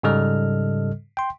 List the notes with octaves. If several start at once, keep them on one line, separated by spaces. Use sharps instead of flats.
G#2 C#3 G3 A4 D#5 F6
G5 C6